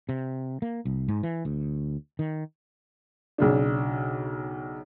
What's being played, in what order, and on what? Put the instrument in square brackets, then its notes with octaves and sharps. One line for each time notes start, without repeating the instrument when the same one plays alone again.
[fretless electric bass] C3
A#3
C2
G#2
E3
D2
D#3
[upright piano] B1 C#3 D4